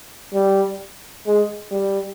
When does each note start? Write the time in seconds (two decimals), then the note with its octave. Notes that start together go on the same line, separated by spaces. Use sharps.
0.34 G3
1.26 G#3
1.71 G3